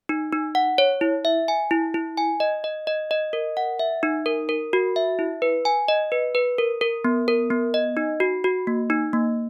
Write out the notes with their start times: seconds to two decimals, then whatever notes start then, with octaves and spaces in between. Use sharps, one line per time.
0.09 D#4
0.33 D#4
0.55 F#5
0.78 C#5
1.01 E4
1.25 E5
1.48 G#5
1.71 E4
1.94 E4
2.17 G#5
2.40 D#5
2.64 D#5
2.87 D#5
3.11 D#5
3.33 A#4
3.57 F#5
3.79 E5
4.03 D#4
4.26 A#4
4.49 A#4
4.73 F#4
4.96 E5
5.19 E4
5.42 B4
5.65 G#5
5.88 D#5
6.12 B4
6.35 B4
6.58 A#4
6.81 A#4
7.04 B3
7.28 A#4
7.50 B3
7.74 D#5
7.97 D#4
8.20 F#4
8.44 F#4
8.67 A#3
8.90 D#4
9.13 A#3